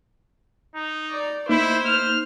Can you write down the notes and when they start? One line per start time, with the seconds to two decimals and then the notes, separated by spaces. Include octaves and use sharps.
0.76 D#4
1.11 D5
1.49 A#3 D#4 E4 C5
1.86 F6